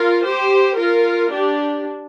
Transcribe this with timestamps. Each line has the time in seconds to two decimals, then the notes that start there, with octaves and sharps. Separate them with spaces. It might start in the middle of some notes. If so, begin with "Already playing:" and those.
Already playing: F4 A#4
0.25 G4 C5
0.78 F4 A#4
1.31 D4 G4